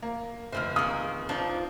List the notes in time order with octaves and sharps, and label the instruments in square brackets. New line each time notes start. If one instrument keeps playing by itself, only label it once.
[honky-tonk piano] A#3
[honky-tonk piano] F1 F6 [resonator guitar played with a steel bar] D3 C4 C5
[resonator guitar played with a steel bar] D#3 G#4 [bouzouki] A#3 [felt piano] D#6
[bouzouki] F3 [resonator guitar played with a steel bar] D4 D#4